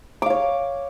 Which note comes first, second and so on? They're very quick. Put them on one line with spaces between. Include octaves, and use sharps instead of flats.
D6 F5 C#5